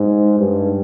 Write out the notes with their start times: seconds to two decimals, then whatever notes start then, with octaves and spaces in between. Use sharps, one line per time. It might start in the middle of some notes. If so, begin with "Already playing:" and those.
Already playing: G#2
0.40 G2